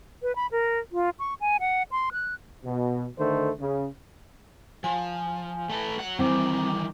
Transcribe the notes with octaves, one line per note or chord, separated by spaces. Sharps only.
B4
B5
A#4
F4
C#6
G#5
F#5
C6
F#6
B2
D3 D#3 A3 C5
C#3
F3 G#5
A3 A4 B4
F#3 F#5
D#3 E3 G3 C4 D6